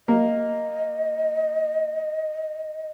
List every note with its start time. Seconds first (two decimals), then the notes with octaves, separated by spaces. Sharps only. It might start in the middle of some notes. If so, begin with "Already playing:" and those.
0.08 A#3 D#5